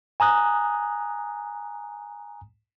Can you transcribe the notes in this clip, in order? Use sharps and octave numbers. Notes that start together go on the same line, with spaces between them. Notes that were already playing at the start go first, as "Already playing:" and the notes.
G#5 A#5 D#6 F#6